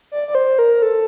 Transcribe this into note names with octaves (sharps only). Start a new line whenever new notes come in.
D5
D5
C5
A#4
A4